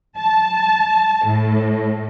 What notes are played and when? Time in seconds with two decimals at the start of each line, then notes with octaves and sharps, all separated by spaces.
0.20 A5
1.27 A2